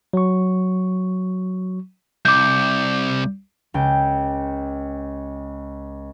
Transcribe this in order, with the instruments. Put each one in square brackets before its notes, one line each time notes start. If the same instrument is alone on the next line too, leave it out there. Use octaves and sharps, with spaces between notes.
[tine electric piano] F#3 C#6
[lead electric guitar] C2 [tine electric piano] D6 G6
[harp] C#2 G5